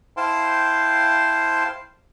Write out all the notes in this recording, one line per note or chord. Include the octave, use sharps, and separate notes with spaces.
E4 C5 F5 G5 A5 C6